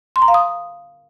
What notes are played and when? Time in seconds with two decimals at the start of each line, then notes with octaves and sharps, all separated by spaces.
0.16 C6
0.22 A#5
0.28 F5
0.34 D#6